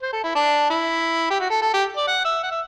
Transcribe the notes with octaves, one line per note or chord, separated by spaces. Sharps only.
C5
A4
E4
D4
E4
G4
F#4
A4
A4
G4
D5
F#5
E5
F#5
E5